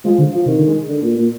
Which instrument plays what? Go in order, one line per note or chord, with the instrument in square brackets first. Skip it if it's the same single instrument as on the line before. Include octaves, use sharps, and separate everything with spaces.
[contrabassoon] F3 [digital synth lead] G#3
[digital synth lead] D3
[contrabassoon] F3
[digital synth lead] C3 [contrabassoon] D#3
[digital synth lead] D3
G#3
[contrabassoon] D3
A#2
A#2